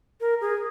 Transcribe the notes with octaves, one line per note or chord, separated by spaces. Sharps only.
A#4
G#4